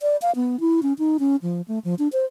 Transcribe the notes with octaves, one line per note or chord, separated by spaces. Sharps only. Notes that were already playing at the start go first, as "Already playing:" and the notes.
D5
F5
B3
E4
C#4
D#4
C#4
F3
A3
F3
D4
C5